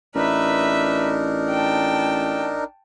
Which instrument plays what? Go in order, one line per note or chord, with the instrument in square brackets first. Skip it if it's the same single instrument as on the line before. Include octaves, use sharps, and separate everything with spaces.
[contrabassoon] A1 [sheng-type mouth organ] D4 D#4 A#4 [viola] B4 E5
[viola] G5 A5